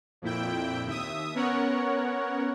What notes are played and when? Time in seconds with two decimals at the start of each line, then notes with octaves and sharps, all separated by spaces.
0.22 F2 A#2 E4 G5
0.86 D#2 E5 D#6
1.35 B3 C#4 A#4 C#5 F#5